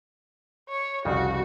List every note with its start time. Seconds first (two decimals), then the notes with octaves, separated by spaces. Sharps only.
0.69 C#5
1.05 C2 F2 C#3 F#4